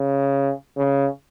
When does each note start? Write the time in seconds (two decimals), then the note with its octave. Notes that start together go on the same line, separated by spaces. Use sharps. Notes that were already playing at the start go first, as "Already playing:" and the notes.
Already playing: C#3
0.78 C#3